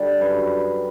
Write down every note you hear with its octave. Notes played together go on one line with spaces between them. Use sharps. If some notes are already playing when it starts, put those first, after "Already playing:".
Already playing: D3 G3 D5
F#2 B4